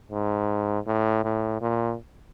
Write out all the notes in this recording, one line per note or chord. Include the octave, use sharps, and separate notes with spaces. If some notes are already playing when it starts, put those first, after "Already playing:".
G#2
A2
A2
A#2